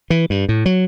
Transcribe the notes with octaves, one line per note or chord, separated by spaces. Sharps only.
E3
G2
A2
F#3